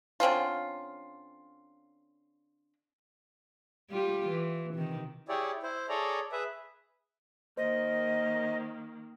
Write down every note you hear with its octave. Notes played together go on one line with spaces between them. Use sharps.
D3 C4 C#4 F4
G3 F4 G4
E3
C3 D#3
E4 G4 G#4 C#5 D5
E4 C5
G#4 A4 C#5 D5 A#5
G#4 B4 E5
D#3 A#3 C5 D#5